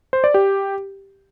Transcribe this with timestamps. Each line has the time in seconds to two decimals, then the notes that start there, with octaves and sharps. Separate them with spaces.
0.13 C5
0.24 D5
0.34 G4